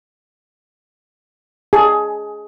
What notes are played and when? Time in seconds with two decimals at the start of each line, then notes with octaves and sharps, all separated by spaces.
1.73 G#4 A5